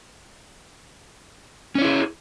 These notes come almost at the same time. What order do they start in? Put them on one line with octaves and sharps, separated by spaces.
C#4 C#5 E4 G#4